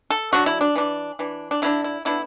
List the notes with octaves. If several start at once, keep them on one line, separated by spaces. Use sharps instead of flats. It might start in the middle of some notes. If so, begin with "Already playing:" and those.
A4
D3 F#3 D4 F#4
E4
D4
E3 D4
E3 D4
D4
D3 B3 D4 E4
E4
D3 B3 D4 E4